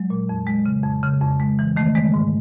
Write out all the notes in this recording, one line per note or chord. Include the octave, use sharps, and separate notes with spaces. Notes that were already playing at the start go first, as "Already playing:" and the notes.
Already playing: F#3 G#3
A#2
F2
G#3
C#3
F2
C#3
F2
G#3
E3
D#3 A3
G#3
G#2